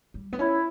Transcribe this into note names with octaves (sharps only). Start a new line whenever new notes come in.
G3
B3
C#4 E4